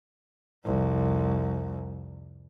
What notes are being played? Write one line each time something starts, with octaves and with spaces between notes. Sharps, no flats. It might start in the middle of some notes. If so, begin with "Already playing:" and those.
C2 F2